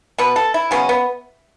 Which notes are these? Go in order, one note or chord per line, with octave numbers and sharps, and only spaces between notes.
B2 B3 B4
A4
E4
C#3 F#3 B3 C#4
B3